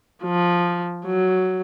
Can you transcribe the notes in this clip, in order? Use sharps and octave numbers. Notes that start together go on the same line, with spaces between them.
F3
F#3